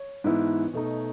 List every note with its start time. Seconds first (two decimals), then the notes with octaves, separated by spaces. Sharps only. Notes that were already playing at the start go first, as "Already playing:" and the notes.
Already playing: C#5
0.24 G#2 E3 B3 E4
0.73 B2 A3 D#4